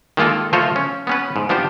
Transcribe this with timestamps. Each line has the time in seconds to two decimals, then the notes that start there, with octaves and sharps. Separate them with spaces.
0.17 D#3 G#3 A#3 F4 A4
0.53 F3 A3 F4 C5 C#5 D#5
0.76 C#4
1.07 B3 C#4 B4
1.36 G#2
1.49 F3 B3 D4 G4 C5